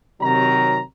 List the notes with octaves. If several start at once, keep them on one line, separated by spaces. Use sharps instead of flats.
C3 D#3 F#3 A#5